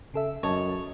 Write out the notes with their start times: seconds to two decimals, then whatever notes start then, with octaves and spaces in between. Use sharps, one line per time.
0.14 C#3 A4 E5
0.43 F#2 A4 C#5 D#5 A5